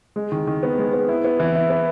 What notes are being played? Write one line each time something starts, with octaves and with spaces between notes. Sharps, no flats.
G#3
D#3
D#3
B3
G#3
B3
E4
B3
E3
E4
B3